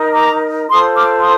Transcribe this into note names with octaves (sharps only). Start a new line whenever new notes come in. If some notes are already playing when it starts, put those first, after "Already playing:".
Already playing: D#4 A#4
A#5 D6
F4 A4 C5 C6 D#6
D6 F6
C6 D#6